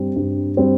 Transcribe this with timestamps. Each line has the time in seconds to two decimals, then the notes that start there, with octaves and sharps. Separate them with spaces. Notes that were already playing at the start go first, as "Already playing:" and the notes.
Already playing: G2 G3 C4
0.16 G2
0.57 G3 C4